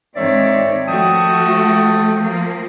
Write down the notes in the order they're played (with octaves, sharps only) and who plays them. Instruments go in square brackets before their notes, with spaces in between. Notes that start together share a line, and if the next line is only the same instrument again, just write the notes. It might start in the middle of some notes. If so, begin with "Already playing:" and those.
[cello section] G#2 D#3 C4 [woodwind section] C#5 D5 E5
[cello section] F3 A3 F#4 [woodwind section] G5 A5 D#6
[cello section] F3 A#3